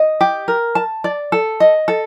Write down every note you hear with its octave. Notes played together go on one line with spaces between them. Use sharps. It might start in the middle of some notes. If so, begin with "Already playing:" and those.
Already playing: D#5
G4
A#4
A5
D5
A4
D#5
A4